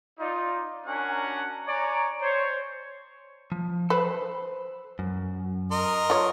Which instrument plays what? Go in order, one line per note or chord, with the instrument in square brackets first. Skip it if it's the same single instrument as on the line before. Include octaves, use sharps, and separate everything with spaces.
[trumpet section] D#4 F4 D5
C#4 D4 F#4 A#4 F#5 G#5
C#5 D5 G#5 A#5
C5 C#5
[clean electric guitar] F3
[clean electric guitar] A4 C5 B5 [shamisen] B4
[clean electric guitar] F#2
[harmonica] A#4 D#5 C6
[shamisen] F4 C#5